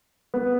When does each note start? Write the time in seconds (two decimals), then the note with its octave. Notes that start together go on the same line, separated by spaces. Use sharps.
0.34 B3